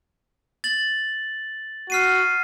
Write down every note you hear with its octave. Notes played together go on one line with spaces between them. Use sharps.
A6 F#7
F#4 F6 C7 D#7